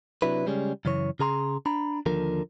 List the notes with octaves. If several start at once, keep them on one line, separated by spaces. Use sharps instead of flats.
C3 F#3 D4 E4 B4
C#3 G3 G#3 C#4
F#2 C#3 E3 C#5
C#3 G#4 A#5 C6
D4 A#5 B5
D#2 D3 F3 A#4